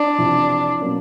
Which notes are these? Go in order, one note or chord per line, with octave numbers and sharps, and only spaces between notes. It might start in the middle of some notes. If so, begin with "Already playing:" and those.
Already playing: D4
F2 C3 E3
B2 F#3 A#3 C#4